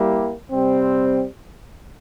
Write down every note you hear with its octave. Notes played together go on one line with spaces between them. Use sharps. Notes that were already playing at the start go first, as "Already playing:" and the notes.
Already playing: G3 A#3 E4 G4
C3 G3 C4